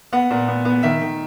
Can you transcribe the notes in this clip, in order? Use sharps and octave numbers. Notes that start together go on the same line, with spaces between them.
B3 F#5
A#2
B3
B3
D#3 E5
D#3